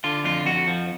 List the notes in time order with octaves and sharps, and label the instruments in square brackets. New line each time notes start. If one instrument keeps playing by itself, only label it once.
[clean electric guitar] D3 F4
F2 F4
F2 F#4
F3